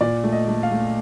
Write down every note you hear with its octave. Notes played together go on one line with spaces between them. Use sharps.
A#2 D5
A3
D#5
A3
F5
A3